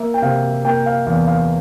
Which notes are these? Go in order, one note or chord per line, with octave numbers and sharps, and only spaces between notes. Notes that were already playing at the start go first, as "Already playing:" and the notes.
Already playing: A#3 E5
G5
C3 F5
A#3 G5
F5
E2 F5
F5